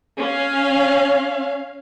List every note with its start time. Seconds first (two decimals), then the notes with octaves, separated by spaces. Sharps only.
0.18 C#4 F5